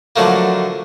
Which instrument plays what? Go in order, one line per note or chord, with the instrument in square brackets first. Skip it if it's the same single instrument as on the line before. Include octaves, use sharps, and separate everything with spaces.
[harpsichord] D3 F3 F#3 A3 A#3